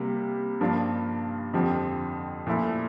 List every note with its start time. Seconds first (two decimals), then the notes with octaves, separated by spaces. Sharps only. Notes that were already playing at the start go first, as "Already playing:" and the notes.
Already playing: C3 G3 A#3
0.61 G2 F3 A#3 D4 F4
1.53 F2 D3 F3 C4 G4
2.47 A#2 F3 A3 E4